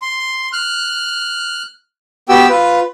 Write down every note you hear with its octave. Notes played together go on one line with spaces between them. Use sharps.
C6
F6 F#6
B3 F#4 G4 G5 E6
F4 B4